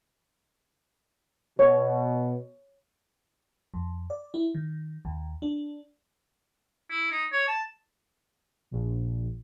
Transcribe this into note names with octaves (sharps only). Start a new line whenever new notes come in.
B2 C#5
F2
D5
E4
D#3
D#2
D4
E4
D#4
C#5
A5
A#1